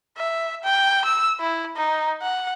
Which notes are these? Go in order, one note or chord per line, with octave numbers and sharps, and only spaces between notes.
E5
G5
E6
E4
D#4
F#5